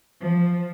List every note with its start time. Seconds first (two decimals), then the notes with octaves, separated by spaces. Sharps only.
0.21 F3